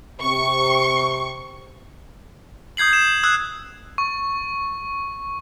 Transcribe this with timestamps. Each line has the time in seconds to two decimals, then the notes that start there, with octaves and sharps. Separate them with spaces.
0.21 C3 C#6
2.77 D#6 G6 G#6 C7 F#7
2.93 E7
3.23 D#6 E6 F#6 G#6
3.98 C#6